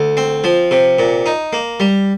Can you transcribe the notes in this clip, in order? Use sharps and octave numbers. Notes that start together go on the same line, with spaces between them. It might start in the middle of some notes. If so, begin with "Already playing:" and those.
Already playing: D2
C4
F3
C3
A#2
D#4
A#3
G3